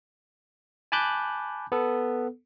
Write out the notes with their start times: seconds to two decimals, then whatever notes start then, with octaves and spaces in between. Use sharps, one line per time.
0.92 G#5 A5 B5 D6 F#6 G6
1.72 B3 A4